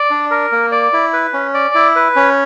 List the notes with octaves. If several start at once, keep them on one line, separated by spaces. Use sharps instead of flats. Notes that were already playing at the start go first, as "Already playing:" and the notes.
Already playing: D5
D4
A#4
A#3
D5
E4
B4
C#4
D5
E4
B4
C#4